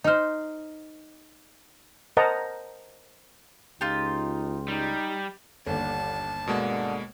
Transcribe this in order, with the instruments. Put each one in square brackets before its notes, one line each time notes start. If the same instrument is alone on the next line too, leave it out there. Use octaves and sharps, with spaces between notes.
[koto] D#4 C5 [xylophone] D#5 F6
[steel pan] A#4 C5 D#5 F#5 A5 A#5
[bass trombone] C#2 [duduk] D#4 [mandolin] F4 G4
[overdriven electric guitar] G3 [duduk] D#4
[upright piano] G1 D#2 [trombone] D3 [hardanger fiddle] A5
[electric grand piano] B2 G#3 A#3 [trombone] D3